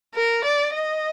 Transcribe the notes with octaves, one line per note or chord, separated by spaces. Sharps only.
A#4
D5
D#5